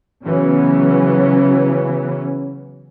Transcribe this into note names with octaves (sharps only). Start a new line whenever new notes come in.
C#3 E3 F#3 B3 C#4